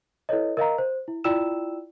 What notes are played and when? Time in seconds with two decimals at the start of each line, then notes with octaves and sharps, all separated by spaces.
0.29 E4 A4 B4 C#5 D#5
0.57 A#4 D#5 F5 A#5
0.78 C5
1.08 E4
1.24 E4 F4 D5 G5 E6 E7